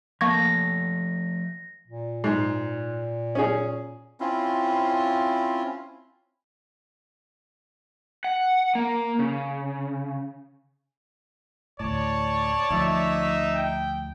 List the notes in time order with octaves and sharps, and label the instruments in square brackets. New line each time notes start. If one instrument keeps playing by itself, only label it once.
[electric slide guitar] F3 A3 A5 [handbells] A#3 C#6 G#6 [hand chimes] A#6
[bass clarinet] A#2
[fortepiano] G#2
C#4 G#4
[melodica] C4 C#4 E4 F4
[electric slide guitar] F#5
A#3
C#3
[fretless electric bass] D2 A2 [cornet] C#5 [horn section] D5 A5
[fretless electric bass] D2 F3 [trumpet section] D#4 E5
[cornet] G5